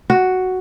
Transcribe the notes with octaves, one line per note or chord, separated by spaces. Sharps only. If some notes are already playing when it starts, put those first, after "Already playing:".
F#4